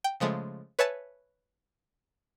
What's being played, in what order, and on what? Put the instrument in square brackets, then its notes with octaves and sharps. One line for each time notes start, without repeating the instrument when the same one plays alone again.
[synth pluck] G5
C#3 F3 G#3 A3
B4 C#5 E5 G#5 A5